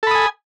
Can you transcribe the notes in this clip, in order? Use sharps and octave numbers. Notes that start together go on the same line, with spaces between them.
A4 G#5 B5 D#6